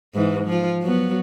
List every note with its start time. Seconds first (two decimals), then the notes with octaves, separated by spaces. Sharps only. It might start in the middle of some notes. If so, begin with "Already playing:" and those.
0.14 G#2 E3
0.46 F3 F4
0.82 F#3 B3